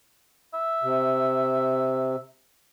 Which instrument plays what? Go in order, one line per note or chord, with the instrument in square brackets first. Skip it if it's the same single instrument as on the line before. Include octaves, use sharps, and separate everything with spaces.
[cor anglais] E5
[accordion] C3